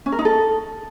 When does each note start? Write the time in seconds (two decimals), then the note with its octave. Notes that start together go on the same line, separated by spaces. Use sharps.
0.06 C#4
0.12 A#4
0.19 D#4
0.25 A4